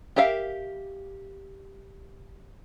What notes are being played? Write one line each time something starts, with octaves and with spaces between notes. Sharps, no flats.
G4 A#4 E5 F5